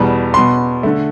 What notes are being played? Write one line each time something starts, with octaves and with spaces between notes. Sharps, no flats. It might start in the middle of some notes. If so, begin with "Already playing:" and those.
Already playing: E2 B2 G3 B3
B2 B3 C6
D3 A3